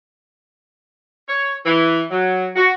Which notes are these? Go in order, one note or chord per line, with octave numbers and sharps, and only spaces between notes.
C#5
E3
F#3
F#4